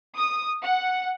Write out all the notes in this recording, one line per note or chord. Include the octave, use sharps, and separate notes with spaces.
D#6
F#5